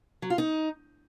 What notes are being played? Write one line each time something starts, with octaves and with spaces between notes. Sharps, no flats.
F#3
F4
D#4